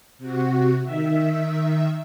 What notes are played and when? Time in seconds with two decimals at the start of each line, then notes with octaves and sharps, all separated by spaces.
0.18 C3 F#4
0.83 D#3 E5